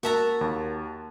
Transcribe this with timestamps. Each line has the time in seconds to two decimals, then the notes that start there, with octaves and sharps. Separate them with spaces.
0.03 A#3 F#4 A#4 E5 A5 A#5 A6
0.41 D#2